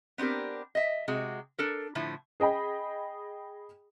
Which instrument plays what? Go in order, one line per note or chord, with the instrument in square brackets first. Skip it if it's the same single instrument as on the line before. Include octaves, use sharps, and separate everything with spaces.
[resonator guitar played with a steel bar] B3 C4 D4 G4 A#4
D#5 E5
C3 G#3 F#4
D4 A4 A#4
A2 D3 F3 E4
[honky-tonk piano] G#4 D#5 G5 B5